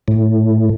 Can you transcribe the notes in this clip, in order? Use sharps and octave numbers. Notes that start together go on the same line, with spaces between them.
A2